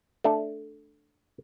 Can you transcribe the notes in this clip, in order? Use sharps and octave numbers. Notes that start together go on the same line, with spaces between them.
A3 D4 A4